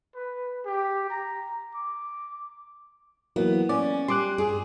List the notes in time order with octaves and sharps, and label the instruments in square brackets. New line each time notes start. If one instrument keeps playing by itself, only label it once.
[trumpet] B4
G4
A#5
D6
[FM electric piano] E3 F#3 A#3 [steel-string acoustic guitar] B3
[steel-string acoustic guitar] C#4 [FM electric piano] D5
[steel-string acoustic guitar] G3 [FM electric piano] C6 D6 F#6
[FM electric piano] G2 [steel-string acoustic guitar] G#4